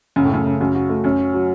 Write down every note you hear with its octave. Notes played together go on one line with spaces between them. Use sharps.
F#2 C#3
A2
F#2 A3
C#3
F#2 F#4
F#4
A3
F#2 C#4
F#4
F#3